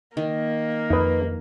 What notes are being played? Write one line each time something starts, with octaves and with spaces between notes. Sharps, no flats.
D#3 A#3
F2 D#4 B4